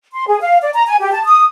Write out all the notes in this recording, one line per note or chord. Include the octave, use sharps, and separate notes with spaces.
C6
G#4
F5
D5
A#5
G#5
G4
A5
D#6